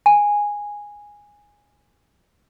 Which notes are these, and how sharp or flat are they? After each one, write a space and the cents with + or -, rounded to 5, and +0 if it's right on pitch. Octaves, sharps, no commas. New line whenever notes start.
G#5 -10